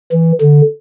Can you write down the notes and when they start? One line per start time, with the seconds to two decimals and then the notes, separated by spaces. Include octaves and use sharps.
0.12 E3
0.41 D3